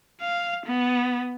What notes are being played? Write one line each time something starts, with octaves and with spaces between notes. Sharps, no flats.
F5
B3